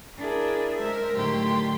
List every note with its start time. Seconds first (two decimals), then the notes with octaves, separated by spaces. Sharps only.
0.18 D4 E4 G#4 A#4
0.78 G#3 A#4 C5 E5
1.14 A2 D3 D#3 F#3 G4 C6